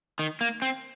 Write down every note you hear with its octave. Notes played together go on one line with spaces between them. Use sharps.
D#3
A#3
C4